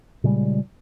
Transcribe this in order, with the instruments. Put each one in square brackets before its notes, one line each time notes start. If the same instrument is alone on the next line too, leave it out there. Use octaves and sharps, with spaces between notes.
[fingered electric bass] A#2 C#3 G3 G#3